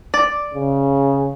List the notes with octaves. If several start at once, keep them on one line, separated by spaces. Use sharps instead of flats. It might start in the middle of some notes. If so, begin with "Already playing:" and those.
D5
C#3